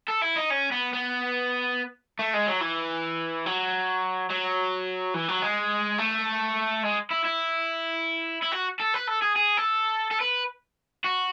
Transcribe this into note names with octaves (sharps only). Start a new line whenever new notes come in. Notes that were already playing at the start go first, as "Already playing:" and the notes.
A4
E4
D#4
C#4
B3
B3
A3
G#3
F#3
E3
F#3
F#3
E3
F#3
G#3
A3
G#3
E4
E4
E4
F#4
A4
B4
A4
G#4
G#4
A4
A4
B4
F#4